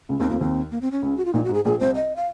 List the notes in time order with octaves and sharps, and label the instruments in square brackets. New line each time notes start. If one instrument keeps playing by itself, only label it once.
[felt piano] C#2 C#3
[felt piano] D#2 D#3 [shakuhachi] C4
[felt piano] F2 F3 [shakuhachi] A#3
[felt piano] D#2 D#3 [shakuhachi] C4
[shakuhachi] A#3
C4
C#4
[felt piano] C#2 C#3
[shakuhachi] F#4
F4
[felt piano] A#1 A#2 [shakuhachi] D#4
[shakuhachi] F#4
[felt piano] G#2
[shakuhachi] G#4
[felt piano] A#1 A#2 [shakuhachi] G#4
[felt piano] C2 C3 [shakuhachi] C5
[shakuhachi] D#5
F5